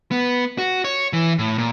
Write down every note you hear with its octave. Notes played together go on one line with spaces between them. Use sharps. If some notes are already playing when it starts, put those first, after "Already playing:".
B3
F#4
C#5
E3
A2
A#2